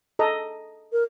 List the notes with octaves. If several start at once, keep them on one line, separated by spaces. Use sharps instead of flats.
A4 D#5 A#5
A#4